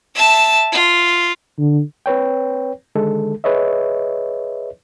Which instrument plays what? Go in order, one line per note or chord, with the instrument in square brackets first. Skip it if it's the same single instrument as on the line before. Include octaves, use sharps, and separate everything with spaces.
[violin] E5 A5
F4
[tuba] D3
[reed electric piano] C4 B4 C#5 G5
D3 D#3 G#3 A4
G#4 B4 C#5 D#5 E5